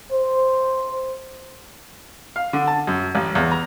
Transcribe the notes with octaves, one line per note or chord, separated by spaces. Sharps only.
C5
F5
D3
A5
F#2
A1
E2
A#5